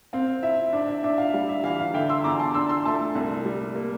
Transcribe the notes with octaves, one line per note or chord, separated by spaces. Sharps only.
C4 F5
E4 E5
D4 E5
E5
D4 E5
F5
G3 F5
E5
E3 F5
F5
D3 E5 G5
C6 E6
E2 A#5 D6
A5 C6
D4 C6 E6
C6 E6
A3 A5 C6
C2
G3
A#3